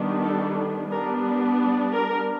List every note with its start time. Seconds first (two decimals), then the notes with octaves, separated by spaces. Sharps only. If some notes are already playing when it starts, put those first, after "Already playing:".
Already playing: D#3 G3 B3 D4
0.23 A4
0.91 G3 B3 D4 A#4
1.94 A#4